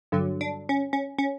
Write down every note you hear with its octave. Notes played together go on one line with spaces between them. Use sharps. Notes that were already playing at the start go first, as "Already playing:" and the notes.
G2 D3 F#3
D4
C#4
C#4
C#4